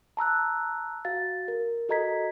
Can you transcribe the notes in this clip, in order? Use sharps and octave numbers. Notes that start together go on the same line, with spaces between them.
A5 A#5 E6 F#6
F#4 F5 A6
A#4
F#4 A4 D#5 A#5 G#6 B6